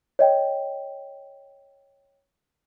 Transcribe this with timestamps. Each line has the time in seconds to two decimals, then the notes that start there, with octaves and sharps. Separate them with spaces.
0.19 C#5 D#5 G5